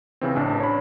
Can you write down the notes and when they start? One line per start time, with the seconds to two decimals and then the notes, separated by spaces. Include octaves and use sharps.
0.21 C#3 E3 C4
0.36 A1 D4
0.60 C#5 B5